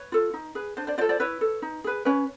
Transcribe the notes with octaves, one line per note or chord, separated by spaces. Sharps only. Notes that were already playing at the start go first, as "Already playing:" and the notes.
Already playing: B4 C#5
F4 A4
D#4
G#4 B4
D4 C5
C5 D5
F4 A4 C5 D5
C5 D5
E4 B4 C#5
A4
D#4
G#4 B4
C#4 B4 C#5